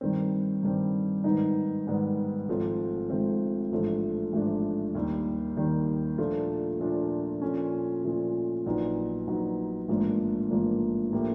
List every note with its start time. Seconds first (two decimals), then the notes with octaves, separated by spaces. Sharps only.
0.01 G2 D#3 G3 C4
0.63 G2 D#3 G3 C4
1.24 G#2 D#3 G3 B3 D#4
1.86 G#2 D#3 G3 B3 D#4
2.49 G#1 G#2 F3 A3 C4
3.10 G#1 G#2 F3 A3 C4
3.72 A1 G#2 F3 A3 D4
4.33 A1 G#2 F3 A3 D4
4.95 D#2 D#3 G3
5.57 D#2 D#3 G3
6.18 A#2 F3 A3 D4 F4
6.80 A#2 F3 A3 D4 F4
7.42 A#2 F3 A3 C#4
8.04 A#2 F3 A3 C#4
8.66 A#1 A#2 F#3 B3 D#4
9.27 A#1 A#2 F#3 B3 D#4
9.88 A1 G#2 F3 A#3 D4
10.50 A1 G#2 F3 A#3 D4
11.12 A2 F3 A#3 D4 G4